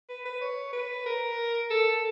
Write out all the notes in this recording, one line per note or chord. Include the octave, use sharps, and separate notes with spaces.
B4
B4
C#5
B4
A#4
A4